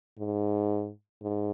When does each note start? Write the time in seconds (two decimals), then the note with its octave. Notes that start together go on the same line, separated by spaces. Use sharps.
0.18 G#2
1.22 G#2